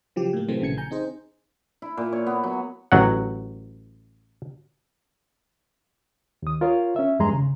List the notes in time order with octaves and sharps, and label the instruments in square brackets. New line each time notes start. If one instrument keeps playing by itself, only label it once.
[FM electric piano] C#3 F3 F#3 G4
A2 A#3
C3 E3 F#3 A3 C4
A#1 C#3 E3 G#6 C#7
G#5 A#5 G6
C4 D#4 G#4 C5
[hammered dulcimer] E4
A#2
C#5
B3
F#3
[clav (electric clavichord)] A1 F#3 F#5
[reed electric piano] D#2 D#6
F4 A#4 C#5 F5
C#4 E5
E2 G2 G#3 G#4 A#5 C6
C#3